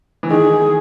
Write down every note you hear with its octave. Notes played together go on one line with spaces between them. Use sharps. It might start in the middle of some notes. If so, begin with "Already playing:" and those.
E3
D#3 G#4